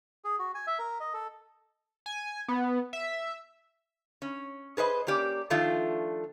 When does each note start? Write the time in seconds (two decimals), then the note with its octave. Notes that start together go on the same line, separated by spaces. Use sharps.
0.25 G#4
0.39 F#4
0.55 G#5
0.67 E5
0.79 A#4
1.00 D#5
1.13 A4
2.06 G#5
2.48 B3
2.93 E5
4.22 C#4
4.77 G#4 B4 C5 D#5
5.07 A#3 C#4 G4 D5
5.50 D#3 F3 A3 D4 F4